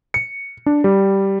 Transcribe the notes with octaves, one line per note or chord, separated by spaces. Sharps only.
C#7
D4
G3